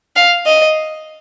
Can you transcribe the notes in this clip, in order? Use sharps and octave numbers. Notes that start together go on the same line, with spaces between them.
F5
D#5